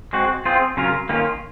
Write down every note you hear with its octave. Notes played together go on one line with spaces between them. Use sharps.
G#3 C4 F#4
C4 F4 G#4 C5
C#3 F#3 C#4 F4 A#4
D#3 A#3 C#4 F4